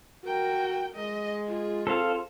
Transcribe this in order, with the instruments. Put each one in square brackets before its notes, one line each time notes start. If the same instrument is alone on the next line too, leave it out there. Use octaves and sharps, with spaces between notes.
[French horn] F#4 [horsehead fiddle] A#4 G5
[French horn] G#3 [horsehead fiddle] D#5
[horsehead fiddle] F4 G#4
[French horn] C4 [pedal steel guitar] A4 C5 F5